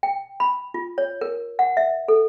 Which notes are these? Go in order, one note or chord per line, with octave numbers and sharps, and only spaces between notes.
G5
B5
F4
C#5
A#4
F#5
E5
A4